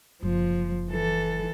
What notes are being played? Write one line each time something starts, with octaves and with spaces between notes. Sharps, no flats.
F#1 F3
E3 A4